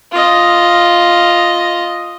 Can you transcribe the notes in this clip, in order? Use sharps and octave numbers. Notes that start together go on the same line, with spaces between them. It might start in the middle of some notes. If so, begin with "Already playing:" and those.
F4 D#5